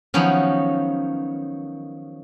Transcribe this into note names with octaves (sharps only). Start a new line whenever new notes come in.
D#3 F3 F#3 B3 C#4